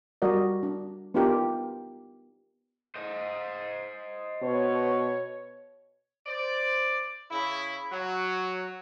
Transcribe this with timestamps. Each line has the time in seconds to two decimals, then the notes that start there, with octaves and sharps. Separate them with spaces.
0.22 G3 F#4 A#4 D5 D#5
0.63 D4
1.14 B3 D4 D#4 F4 G4 A#4
2.96 C5 D#5
4.42 B2 C#5
6.27 C5 D5
7.31 C#3 E4
7.92 F#3